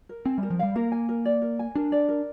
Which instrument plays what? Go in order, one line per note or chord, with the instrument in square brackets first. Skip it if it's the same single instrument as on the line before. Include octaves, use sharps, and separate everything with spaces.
[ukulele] A#4
[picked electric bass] C4 [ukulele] G#5
[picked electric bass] G3 [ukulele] A#4
[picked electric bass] F3
[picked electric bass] G3 [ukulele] F5
[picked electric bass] A#3 [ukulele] A#4
[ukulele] G#5
A#4
D5
A#4
G#5
[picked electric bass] D4 [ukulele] A#4
[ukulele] D5
A#4